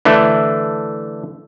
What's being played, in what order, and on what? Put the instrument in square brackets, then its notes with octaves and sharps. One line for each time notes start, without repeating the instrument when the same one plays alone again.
[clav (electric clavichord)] D3 E3 A3